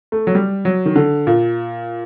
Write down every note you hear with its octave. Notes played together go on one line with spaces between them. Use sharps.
A3
F#3
G3
F#3
D#3
D3
A#2